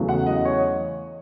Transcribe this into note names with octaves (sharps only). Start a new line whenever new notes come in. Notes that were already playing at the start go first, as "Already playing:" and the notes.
Already playing: E2 C#3 F#3 A3 E4
F#5
D#5
C#5